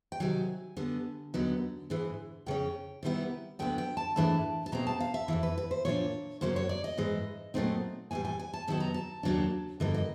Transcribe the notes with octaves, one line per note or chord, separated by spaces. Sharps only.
G5
C3 D#3 F#3 G#5
D3 G3 B3
D#2 D3 F#3 B3 D#4
G#2 E3 G#3
F2 C#3 C#4 G5
C3 D#3 G3 B3 E4
D2 D3 F#3 B3 G5
G5
A5
G#2 E3 A3 D4 A5
A5
B2 G#3 C4 A#5
A5
F5
E5
F2 C#3 E3
B4
B4
C5
A#2 F3 A#3 D4 C#5
F#2 C#3 F#3 A#3 C#4 C5
C#5
D5
D#5
G#2 E3 G#3
A#2 F#3 A3 C4 D#4
A2 E3 G3 G#5
G#5
G#5
A5
C3 D#3 F#3 B3 A5
A#5
A5
D#2 C#3 F#3 A#3 D4
G2 D3 F3 A#3 D#5
D#5